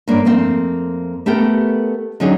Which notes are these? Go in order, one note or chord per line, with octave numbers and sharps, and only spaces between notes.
G2 A#3 C#4 D5
F2 A3 A#3 C4
A3 B3 G4 A4 A#4 G5
D3 F#3 C#4 D#4 G#4